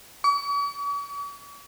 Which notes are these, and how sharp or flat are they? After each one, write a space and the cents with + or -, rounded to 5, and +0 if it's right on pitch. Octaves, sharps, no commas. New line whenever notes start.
C#6 +45